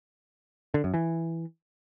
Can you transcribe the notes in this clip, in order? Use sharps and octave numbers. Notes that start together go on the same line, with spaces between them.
D3
F#2
E3